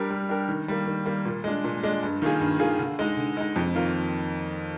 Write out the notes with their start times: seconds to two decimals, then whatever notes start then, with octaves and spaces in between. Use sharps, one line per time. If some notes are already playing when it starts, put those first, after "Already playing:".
Already playing: G3 D4 G4 A#4
0.10 G3
0.29 D4 G4 A#4
0.48 D#3
0.68 G3 A#3
0.86 D#3
1.06 G3 A#3
1.25 A#2
1.44 G#3 D4
1.64 A#2
1.83 G#3 D4
2.03 G2
2.22 D#3 A#3 F4 G#4
2.41 G2
2.59 D#3 A#3 F4 G#4
2.79 D3
2.99 G#3 D#4
3.17 D3
3.37 G#3 D#4
3.56 F2
3.75 D#3 A#3 F4 A#4